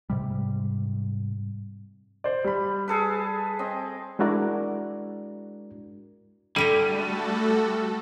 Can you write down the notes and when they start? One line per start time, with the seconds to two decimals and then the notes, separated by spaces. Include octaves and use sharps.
0.10 G#2 C3 G3
2.24 C5 D5
2.44 G3 B5
2.88 G#4 A4 B4
3.59 C4 D#5
4.19 G#3 D4 E4 F#4 A#4 D5
6.56 D3 G3 A3 E4 F#4 A4 A#5 D#7